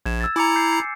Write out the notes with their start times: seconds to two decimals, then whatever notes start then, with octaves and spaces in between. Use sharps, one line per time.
0.06 A#1 G#6 E7
0.21 E6 A6
0.36 E4 G#5 A#5 D6 C#7
0.55 D6 G6 C7
0.73 C7